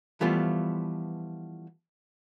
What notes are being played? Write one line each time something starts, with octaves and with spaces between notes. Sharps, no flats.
E3 F3 G3 A3 B3 F4